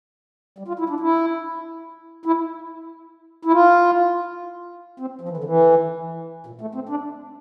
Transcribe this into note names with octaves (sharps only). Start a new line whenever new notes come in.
G3
F4
E4
D4
E4
E4
E4
F4
C4
F3
E3
D3
E3
A#2
A3
C4
D4